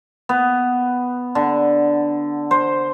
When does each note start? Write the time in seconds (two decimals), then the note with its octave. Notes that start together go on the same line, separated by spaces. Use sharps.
0.29 B3
1.35 D3
2.51 C5